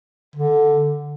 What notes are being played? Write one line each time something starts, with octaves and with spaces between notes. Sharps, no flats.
D3